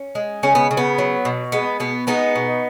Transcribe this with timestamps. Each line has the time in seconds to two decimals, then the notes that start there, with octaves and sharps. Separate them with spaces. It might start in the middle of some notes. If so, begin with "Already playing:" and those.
Already playing: C#4
0.15 G#3
0.43 C#3 C#4
0.55 B3
0.71 C#3
0.77 B3
0.98 F#3
1.25 B2
1.52 G#3 B3
1.80 B2 B3
2.07 G#3 B3 D#4
2.36 B2